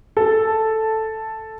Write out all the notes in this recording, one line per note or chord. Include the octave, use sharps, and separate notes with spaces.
A4